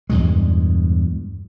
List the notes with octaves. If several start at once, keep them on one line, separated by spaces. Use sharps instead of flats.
E2 G2 A#2 G#3